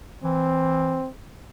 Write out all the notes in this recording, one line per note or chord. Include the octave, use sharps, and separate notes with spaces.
E3 C4